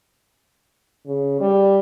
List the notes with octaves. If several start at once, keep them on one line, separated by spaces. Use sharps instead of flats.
C#3
G3